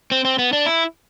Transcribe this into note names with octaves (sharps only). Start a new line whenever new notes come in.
C4
C4
B3
D4
E4